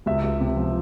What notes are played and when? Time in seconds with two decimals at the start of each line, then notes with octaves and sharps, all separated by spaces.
0.06 C#2 E5
0.23 C#2
0.40 C3
0.57 F3